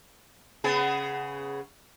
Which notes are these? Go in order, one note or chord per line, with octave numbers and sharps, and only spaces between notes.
C#3 B3 G#4